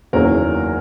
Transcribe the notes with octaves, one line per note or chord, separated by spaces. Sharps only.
F#1 E2 D#3 F#3 A#3 A#4